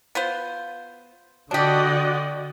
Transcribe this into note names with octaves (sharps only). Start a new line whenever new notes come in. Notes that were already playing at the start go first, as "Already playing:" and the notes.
B3 F4 C5
D3 D4 F#4 G4 D5 D#5